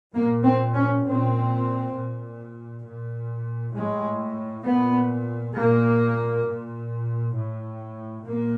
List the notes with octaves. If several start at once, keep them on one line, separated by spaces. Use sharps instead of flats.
A#2 A#3
C4
C#4
A#2 C4
A#2
A#2
A2 G#3
A#2 B3
A#2 A#3
A#2
A2
A#2 A#3